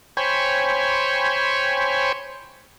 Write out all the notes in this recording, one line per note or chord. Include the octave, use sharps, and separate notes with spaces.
C5 C#5 G5 G#5 B5 C#6